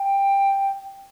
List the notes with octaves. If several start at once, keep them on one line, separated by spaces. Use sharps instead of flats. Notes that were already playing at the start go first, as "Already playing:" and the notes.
Already playing: G5